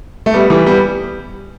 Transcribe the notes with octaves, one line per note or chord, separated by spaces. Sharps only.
A3
G3 B3
E3 G3
G3 B3